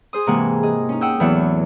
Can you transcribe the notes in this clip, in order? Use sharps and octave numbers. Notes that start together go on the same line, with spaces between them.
G#4 C5 D#6
G#2 C3 E3 A#3 F#5 G#5
G#4 D#5
C#4 D#4
F#5 G5 D#6 E6 G6
E2 A2 E3 F#3 E5 F#5